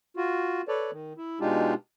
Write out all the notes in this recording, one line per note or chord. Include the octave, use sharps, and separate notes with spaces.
F4 F#4
A4 B4 C#5 D5
D#3
E4
B2 G#3 D4 D#4 F4 G4